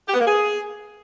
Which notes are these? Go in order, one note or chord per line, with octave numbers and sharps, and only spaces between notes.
G4
B3
A#3
G#4